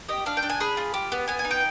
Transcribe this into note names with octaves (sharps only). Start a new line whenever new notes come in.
G4 D#5
D4 F5
G5
D4
G#5
G#4 B5
F4
G4
B3
B3 G#5
G#5
D#4
G5